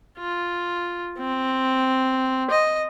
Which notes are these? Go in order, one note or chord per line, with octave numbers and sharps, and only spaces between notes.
F4
C4
D#5